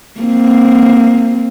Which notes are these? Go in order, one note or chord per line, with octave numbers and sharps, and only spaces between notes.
A#3 C4